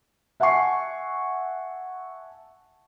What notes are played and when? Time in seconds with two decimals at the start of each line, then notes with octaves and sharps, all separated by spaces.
0.40 E5 F#5 G#5 A5 C#6 C7